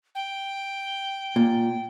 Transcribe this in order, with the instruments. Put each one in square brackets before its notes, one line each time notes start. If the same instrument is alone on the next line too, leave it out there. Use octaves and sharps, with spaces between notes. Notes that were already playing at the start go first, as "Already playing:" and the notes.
[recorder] G5
[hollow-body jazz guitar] A#2